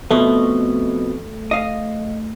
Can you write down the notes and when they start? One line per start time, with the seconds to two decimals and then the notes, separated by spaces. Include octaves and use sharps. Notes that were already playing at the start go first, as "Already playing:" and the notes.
0.11 F2 B2 A3
1.51 D#5 F5